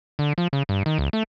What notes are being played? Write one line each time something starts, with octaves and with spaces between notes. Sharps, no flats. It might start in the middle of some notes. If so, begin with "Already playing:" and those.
D3
F3
C#3
G2
D#3
C#2
A3